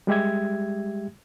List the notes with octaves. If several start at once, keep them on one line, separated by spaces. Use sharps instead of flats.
G3 G#3 G4 E5 G#6